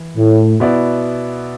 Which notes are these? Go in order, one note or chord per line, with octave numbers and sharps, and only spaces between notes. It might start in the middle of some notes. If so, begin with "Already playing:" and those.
Already playing: E3
A2
B2 B3 E4 D5